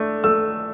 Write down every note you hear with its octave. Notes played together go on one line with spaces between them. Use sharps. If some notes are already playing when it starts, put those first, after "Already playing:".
Already playing: A3 D4
A3 E6